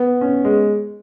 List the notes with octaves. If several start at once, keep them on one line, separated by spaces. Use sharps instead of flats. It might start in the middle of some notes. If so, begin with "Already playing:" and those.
Already playing: B3
C#4
G#3